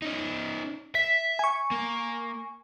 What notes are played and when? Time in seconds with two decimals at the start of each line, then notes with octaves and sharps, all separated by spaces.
0.02 C#4 D#4
0.95 E5 B6
1.39 G#5 C#6
1.71 A#3